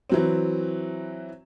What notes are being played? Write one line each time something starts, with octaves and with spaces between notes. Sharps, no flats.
E3 F#3 C4